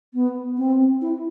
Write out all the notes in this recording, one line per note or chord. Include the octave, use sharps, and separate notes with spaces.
B3
C4
E4